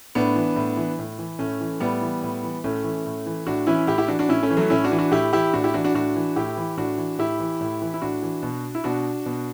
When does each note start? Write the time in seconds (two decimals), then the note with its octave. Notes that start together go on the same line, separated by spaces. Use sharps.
0.15 A2 B3 D4
0.36 E3
0.56 A2
0.77 E3
0.99 A2
1.19 E3
1.39 A2 A3 C#4
1.61 E3
1.80 A2 G3 B3
2.02 E3
2.22 A2
2.43 E3
2.64 A2 A3 C#4
2.84 E3
3.06 A2
3.26 E3
3.47 A2 D4 F#4
3.67 E3 C#4 E4
3.87 A2 E4 G4
3.98 E4 G4
4.08 E3 D4 F#4
4.19 D4 F#4
4.29 A2 C#4 E4
4.43 A3 C#4
4.50 E3
4.57 F#3 A3
4.70 A2 C#4 E4
4.84 D4 F#4
4.92 E3
4.98 D4 F#4
5.12 A2 E4 G4
5.33 E3 E4 G4
5.53 A2 D4 F#4
5.64 E4 G4
5.74 E3 D4 F#4
5.84 D4 F#4
5.94 A2 D4 F#4
6.16 E3
6.36 A2 E4 G4
6.57 E3
6.77 A2 D4 F#4
6.98 E3
7.18 A2 E4 G4
7.40 E3
7.61 A2
7.82 E3
7.94 E4
8.02 A2 D4 F#4
8.23 E3
8.43 B2
8.75 E4
8.84 B2 D4 F#4
9.26 B2